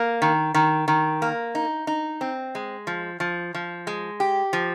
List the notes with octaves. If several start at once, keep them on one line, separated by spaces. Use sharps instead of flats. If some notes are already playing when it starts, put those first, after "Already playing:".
Already playing: A#3
D#3
D#3
D#3
A#3
D#4
D#4
C4
G#3
F3
F3
F3
G#3
G4
F3